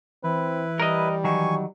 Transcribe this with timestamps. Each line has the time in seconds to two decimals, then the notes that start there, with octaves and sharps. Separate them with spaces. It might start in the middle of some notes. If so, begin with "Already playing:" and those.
0.24 E3 C4 E4 B4
0.80 G3 A#4 D#5
1.24 D#3 F#3 G#5 C#6